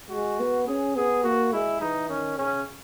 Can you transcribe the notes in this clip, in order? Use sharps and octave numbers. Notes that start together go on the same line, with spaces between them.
G#3 F#4
B3
C#4 G#4
B3 G#4
A#3 F#4
G#3 E4
E3 D#4
D#3 C#4
C#3 C#4